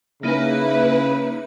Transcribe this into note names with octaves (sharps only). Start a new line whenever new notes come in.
C#3 A#3 D#4 E4 B4